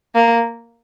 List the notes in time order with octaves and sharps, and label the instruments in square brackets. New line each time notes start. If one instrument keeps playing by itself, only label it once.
[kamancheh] A#3